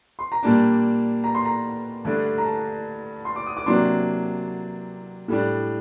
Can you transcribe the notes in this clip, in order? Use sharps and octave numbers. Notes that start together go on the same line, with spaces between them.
C6
A#5
A#2 G3 A#3 D4 A5
A#5
C6
A#5
G2 D3 A3 D4
A#5
A5
C6
D6
D#6
D6
C3 F#3 A#3 D4 C6
A2 G3 D4